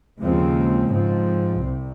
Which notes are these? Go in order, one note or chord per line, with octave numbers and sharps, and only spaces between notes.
D#2 C#3 F3 G#3 C4
G#2 F3 C4
C2 C3